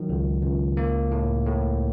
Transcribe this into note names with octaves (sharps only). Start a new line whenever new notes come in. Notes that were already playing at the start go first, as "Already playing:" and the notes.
Already playing: D#3 F#3
C#2
C#2
A#3
A2
A2